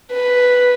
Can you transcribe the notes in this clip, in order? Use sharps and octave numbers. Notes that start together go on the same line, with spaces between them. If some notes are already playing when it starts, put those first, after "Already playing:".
B4